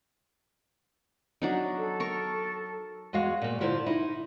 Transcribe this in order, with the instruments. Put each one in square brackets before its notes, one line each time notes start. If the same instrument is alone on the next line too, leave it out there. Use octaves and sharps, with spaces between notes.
[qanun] F#3 D4 D#4
[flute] A4
[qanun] A#4 C#6
[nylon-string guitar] E2 G#3 F#4 F5
A#2 A#3
D3 E4 F4 A#4 C5 D5
D#4 E4